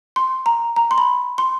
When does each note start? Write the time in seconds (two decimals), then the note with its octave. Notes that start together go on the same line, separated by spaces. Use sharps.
0.16 C6
0.46 A#5
0.76 A#5
0.91 C6
0.98 B5
1.38 C6